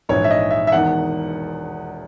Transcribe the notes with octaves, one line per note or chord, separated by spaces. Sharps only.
A#1 G#2 E3 C#5
E5
D#5
E5
E5
E1 E2 D#3 F#5